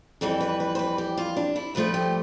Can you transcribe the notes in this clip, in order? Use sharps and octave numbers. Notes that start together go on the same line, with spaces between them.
F2 E3 G3 A4
B4
B4
C5
B4
G4
F4
D4
E4
G2 F3 A3 B4
G4